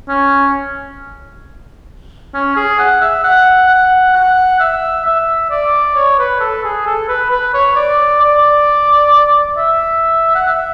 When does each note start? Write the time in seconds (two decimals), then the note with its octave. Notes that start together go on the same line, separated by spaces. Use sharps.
0.08 C#4
2.34 C#4
2.56 G#4
2.79 F#5
3.01 E5
3.24 F#5
3.69 F#5
4.15 F#5
4.60 E5
5.05 E5
5.50 D5
5.95 C#5
6.18 B4
6.40 A4
6.64 G#4
6.86 A4
7.08 B4
7.30 B4
7.54 C#5
7.76 D5
8.21 D5
9.57 E5
10.35 F#5
10.48 E5